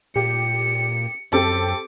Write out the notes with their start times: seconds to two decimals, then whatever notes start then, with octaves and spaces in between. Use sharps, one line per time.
0.16 A#2 G4 C#7
1.33 F#2 C4 G4 A4 D6